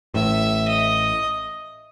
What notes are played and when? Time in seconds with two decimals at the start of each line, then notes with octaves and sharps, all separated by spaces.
0.14 A1 A2 E5
0.68 D#5